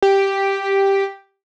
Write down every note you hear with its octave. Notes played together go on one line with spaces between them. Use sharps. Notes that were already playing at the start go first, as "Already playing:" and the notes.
G4